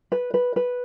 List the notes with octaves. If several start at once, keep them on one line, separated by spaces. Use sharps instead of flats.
B4
B4
B4